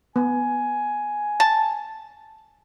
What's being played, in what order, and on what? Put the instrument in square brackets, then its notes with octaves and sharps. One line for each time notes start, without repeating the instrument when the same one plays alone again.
[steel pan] B3 [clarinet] G#5
[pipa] A5